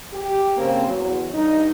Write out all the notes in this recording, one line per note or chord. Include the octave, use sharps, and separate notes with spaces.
G4
C#3 A#3 C4
E2 F#3
G2 D#4